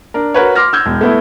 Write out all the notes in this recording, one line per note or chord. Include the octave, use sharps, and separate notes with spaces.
D4 A#4
F#4 A#4 B4 C#5
C6 D6 F6 A#6
E6 G6 G#6
E1
A3 B3 E4